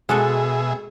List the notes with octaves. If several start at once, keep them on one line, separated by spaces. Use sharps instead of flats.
B2 G#3 F#4 G#4 A4 E5